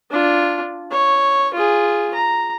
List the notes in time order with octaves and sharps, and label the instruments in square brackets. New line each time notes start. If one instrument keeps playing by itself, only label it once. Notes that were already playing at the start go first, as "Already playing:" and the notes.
[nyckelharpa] D4 F4
C#5
F4 G#4
A#5